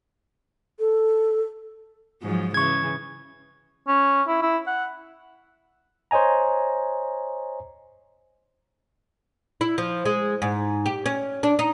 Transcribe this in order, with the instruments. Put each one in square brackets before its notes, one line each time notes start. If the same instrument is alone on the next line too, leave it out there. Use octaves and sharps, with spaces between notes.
[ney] A4
[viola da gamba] G#2 F3 F#3
[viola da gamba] C#3 E3 [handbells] C#6 G#6
[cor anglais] C#4
E4
E4
F#5
[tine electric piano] C5 C#5 D#5 G#5 A#5
[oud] E4
F3
G#3
G#2
G4
C#4
D4
D#4